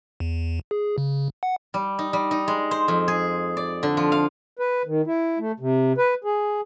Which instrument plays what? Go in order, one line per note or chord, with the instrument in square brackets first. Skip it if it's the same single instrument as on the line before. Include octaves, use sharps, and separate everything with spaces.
[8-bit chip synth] E2
G#4
C#3
F#5
[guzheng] G3
D#4
G3
D#4
G#3
C5
F2
G#4
D5
D3
F3
F5
[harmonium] B4
D#3
E4
A3
C3
B4
G#4